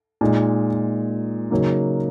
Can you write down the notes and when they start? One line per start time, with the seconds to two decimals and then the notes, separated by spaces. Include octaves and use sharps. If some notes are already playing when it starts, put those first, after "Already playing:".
0.21 A#2 G#3 D#4
1.51 C#3 F#3 A#3 D#4